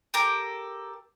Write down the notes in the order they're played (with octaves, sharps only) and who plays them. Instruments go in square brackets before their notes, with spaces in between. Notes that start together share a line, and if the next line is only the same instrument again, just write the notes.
[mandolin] G4 A4 A#4